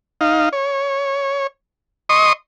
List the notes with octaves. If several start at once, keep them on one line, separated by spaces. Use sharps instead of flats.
D#4 F5
C#5
D#5 C6 C#6 D#6